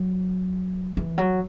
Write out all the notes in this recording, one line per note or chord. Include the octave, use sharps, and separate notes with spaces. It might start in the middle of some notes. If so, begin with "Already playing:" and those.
Already playing: F#3
E3
F#3